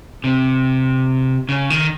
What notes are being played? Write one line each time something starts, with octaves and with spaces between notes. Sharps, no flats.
C3
C#3
D#3